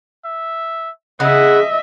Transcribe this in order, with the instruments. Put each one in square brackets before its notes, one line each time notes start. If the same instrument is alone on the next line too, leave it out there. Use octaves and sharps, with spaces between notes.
[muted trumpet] E5
[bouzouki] C#3 E4 G#4 [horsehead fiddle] D#5 E5 [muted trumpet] F#5